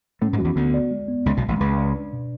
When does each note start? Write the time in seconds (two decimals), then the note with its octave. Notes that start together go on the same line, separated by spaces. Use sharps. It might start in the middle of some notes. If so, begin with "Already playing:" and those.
0.21 A2 A3 C#4
0.33 G#2 G#3
0.39 F#3 F#4
0.45 E2 E3
0.56 D2 D3 B3
0.74 D5
0.91 G#3
1.08 B3
1.25 C#2 C#3 G#3
1.37 B1 B2
1.43 G#3
1.48 A1 A2
1.60 C#2 C#3 B4
1.78 D5
1.95 D4
2.13 B2